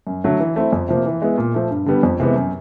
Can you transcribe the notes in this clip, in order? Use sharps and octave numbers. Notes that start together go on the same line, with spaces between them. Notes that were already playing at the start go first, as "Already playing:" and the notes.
F#2
D3 F#3 A3
E3
A3 C4 E4
F2
C3 F3 A#3
E3
G#3 B3 E4
A#2
F3 A3
G2
D3 G3 B3
F2
C3 E3 G#3 B3
F#2